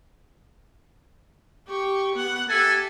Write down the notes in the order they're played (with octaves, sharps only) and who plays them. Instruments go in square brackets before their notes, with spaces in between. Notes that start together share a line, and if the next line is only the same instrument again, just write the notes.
[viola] G4 C#6
B3 F#5
[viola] G4 [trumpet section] A4 E5 G#5